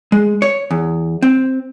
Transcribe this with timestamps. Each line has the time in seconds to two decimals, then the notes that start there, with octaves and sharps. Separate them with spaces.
0.12 G#3
0.42 C#5
0.71 E2
1.22 C4